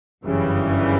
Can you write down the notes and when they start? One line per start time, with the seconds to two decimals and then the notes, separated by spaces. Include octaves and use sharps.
0.24 G1 F#2 C#3 E3 G3